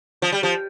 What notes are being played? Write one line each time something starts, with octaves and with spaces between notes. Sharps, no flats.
F3
G3
F3